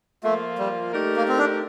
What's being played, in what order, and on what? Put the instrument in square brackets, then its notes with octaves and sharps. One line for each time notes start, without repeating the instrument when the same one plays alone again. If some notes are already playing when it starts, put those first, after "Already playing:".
[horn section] F3 A#3 F4 [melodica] A3
[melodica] G3
[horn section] A3 D#4 G4 A#4 D5
[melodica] A#3
C4
D4